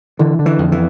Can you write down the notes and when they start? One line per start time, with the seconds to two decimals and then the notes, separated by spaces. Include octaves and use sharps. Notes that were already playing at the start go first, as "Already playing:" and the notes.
0.19 D3 E3
0.39 D3
0.46 E3
0.58 F2
0.72 E3